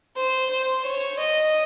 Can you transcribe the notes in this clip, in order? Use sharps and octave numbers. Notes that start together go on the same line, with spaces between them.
C5
C5
C#5
D#5